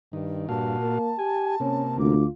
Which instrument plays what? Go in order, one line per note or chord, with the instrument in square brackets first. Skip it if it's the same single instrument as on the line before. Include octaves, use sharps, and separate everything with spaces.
[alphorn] G2 [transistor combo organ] D#3
[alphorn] G2 [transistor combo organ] A#2 F#4 F5 [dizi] A5
[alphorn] A#3
[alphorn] G4 [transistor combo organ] G#5
[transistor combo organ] C3 A#3 [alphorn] C#4
[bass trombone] D2 [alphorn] F4 [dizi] D6